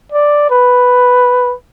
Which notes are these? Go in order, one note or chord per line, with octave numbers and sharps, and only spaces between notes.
D5
B4